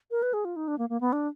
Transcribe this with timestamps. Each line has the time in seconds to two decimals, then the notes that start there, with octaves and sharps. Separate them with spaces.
0.11 A#4
0.22 B4
0.33 G#4
0.45 F4
0.56 D#4
0.68 D4
0.78 A#3
0.89 A#3
1.01 B3
1.13 D4